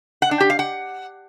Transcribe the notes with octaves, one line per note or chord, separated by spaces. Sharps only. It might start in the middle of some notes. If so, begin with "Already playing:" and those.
F#5
D4
G4
F5
F#5